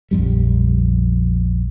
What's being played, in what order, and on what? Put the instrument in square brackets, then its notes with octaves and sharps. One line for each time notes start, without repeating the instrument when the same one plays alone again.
[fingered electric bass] A#1 F2 G3